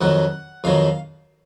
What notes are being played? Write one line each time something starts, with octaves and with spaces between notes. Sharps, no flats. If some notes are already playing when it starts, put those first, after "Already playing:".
F2 D#3 F#3 F#5
F2 D#3 F#3 F5